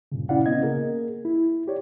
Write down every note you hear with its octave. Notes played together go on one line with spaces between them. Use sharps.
G2 A#2 C#3
C#4 E4 D5 F5 F#5
C#3 B3 C#4 D#5 G#6
A#3 G#4 A#4
E4
G4 C#5 D5